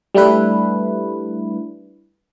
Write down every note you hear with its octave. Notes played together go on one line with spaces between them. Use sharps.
G3 A3 D4 E4 B4